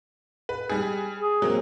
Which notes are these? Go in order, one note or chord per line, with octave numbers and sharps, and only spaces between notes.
B4
G3 G#4
G#4
F#3 A#3 C4